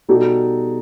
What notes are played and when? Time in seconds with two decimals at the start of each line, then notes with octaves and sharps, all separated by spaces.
0.09 B2 G3 D#4 F#4 A4